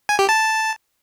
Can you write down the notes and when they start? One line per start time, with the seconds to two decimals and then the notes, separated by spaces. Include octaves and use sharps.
0.09 G#5
0.19 G4
0.29 A5